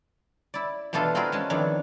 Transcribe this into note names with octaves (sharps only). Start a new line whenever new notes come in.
E4 D5
B2 E3 A3 D4 F4 A4
C4 F4 F#4 G#4 A#4 B4
G#3 C#4 A5
F2 D#3 E3 D4 C#5 D5